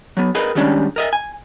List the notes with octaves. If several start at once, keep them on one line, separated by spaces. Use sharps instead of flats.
F#3 B3
G#4 A#4 B4 D#5
D#3 G3 G#3 C#4 D4
A#4 D#5 E5
G#5